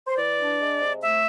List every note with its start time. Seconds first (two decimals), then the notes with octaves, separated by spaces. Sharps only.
0.07 C5
0.17 E3 D5
0.38 D4
0.60 G#3
0.81 C3
1.01 A3 E5